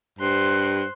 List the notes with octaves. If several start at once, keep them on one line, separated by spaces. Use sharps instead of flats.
G2 C5 C6 F#6